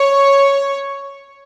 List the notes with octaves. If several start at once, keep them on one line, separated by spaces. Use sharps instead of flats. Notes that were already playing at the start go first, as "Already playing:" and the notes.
Already playing: C#5